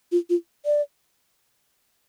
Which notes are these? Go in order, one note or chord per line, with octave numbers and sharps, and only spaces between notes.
F4
F4
D5